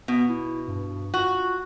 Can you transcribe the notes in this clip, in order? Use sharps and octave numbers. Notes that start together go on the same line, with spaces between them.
B2 B3
E4
G2
F4 F#4